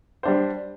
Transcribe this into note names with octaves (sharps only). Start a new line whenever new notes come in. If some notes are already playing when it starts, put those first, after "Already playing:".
G3 D4 C5